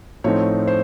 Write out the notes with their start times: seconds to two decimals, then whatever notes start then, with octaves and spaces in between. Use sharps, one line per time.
0.24 A2 F3 A3 C4 D#4 C#5
0.67 C5